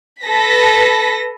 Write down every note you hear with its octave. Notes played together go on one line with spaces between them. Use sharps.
A4 B4 A#6 B6